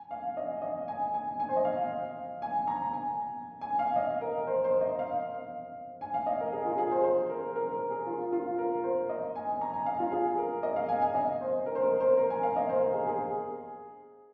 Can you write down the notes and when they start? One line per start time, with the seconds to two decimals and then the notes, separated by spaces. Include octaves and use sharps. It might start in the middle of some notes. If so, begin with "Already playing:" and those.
Already playing: G#5
0.11 F5
0.37 D#5
0.62 D#5
0.88 G#5
1.14 G#5
1.40 G#5
1.48 C5
1.57 D#5
1.65 F5
2.42 G#5
2.67 A#5
2.93 G#5
3.61 G#5
3.79 F5
3.96 D#5
4.21 A#4
4.47 C5
4.64 C5
4.81 D#5
4.99 F5
6.01 G#5
6.14 F5
6.26 D#5
6.40 A#4
6.52 G#4
6.65 F4
6.78 G#4
6.91 C5
7.03 C5
7.30 A#4
7.55 A#4
7.72 A#4
7.90 G#4
8.06 F4
8.32 F4
8.58 A#4
8.84 C5
9.09 D#5
9.36 G#5
9.61 A#5
9.73 G#5
9.86 F5
10.00 F4
10.12 G#4
10.38 A#4
10.63 D#5
10.76 F5
10.89 G#5
11.02 G#5
11.15 D#5
11.41 C5
11.66 A#4
11.75 C5
11.83 A#4
12.00 C5
12.17 A#4
12.30 G#5
12.43 F5
12.56 D#5
12.69 C5
12.82 A#4
12.94 G#4
13.07 G#4